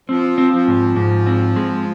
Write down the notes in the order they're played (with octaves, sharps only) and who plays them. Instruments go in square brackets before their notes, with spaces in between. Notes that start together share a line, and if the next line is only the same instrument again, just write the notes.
[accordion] F3 [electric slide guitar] C4
[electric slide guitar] C4
[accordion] F3
[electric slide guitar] G#2
G#2
C4
G#3